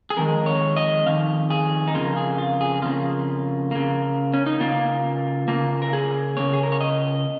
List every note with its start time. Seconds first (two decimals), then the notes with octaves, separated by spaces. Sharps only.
0.10 G#4
0.17 F2 D#3 G#3 A#4
0.46 C#5
0.76 D#5
1.06 F2 D#3 F5
1.50 G#4
1.87 D#4
1.94 F2 C#3 A#3 F4
2.17 G#4
2.38 F4
2.61 G#4
2.82 F2 C#3 A#3 F4
3.71 C#3 A#3
4.34 C#4
4.46 D#4
4.60 C#3 A#3 F4
5.48 C#3 A#3 F4
5.82 A#4
5.93 G#4
6.37 C#3 A#3 C#5
6.53 G#4
6.63 A#4
6.72 C#5
6.81 D#5